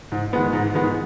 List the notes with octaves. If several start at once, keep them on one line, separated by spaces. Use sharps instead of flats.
G#2
D#3 G#3 B3
G#2
D#3 G#3 B3